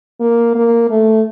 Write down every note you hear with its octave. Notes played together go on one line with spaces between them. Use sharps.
A#3
A#3
A3